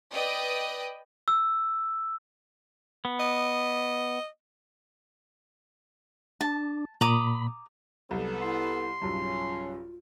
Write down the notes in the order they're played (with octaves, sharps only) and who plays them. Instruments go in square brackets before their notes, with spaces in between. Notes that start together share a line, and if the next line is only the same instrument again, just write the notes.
[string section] B4 D5 D#5 G5 D#6
[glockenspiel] E6
[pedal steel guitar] B3
[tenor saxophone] D#5
[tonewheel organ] D4 [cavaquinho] A5
[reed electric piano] A#2 [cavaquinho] A#5 D6 D#6 [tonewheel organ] B5
[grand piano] C2 [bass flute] F#3 [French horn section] B3 A4
[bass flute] E4 [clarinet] C6
[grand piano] B1 G2 [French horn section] C#3 C#4 [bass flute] F4